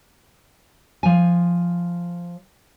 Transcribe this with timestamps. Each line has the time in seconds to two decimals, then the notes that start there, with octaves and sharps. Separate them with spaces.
1.03 F3 G#5